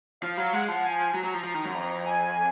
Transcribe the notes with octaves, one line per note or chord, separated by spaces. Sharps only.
F3 F5
F#3
G#3 F#5
F3
G#5
F#3 A#5
F#3
F3
F3
D#3
F#2
F2
G#5